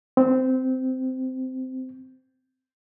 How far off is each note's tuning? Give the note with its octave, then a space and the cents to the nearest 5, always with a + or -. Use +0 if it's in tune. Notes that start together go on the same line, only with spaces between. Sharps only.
C4 -15